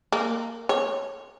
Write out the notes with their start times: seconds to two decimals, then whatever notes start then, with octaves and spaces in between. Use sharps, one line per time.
0.12 A#3
0.69 C#5